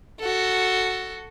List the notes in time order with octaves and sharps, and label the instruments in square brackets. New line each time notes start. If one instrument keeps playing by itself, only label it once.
[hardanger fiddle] F#4 A4